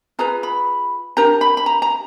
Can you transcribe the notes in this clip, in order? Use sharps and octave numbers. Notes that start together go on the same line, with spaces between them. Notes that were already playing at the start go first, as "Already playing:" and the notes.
F4 G#4 B4 A#5
B5
D4 G4 A#4 A#5
B5
B5
A#5
A#5